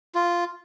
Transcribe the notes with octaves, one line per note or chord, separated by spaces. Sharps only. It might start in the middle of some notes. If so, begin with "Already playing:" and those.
F4